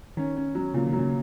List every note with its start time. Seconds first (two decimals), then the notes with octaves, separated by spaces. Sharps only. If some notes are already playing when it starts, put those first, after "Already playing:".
0.17 D#3 C#4
0.36 C#4
0.55 F#3
0.74 A#2 C#3
0.87 D#3
0.93 F#3
0.99 C#3